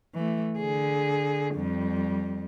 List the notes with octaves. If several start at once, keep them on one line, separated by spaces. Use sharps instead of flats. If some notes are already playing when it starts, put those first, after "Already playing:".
E3 A3
D3 G#4
F2 G3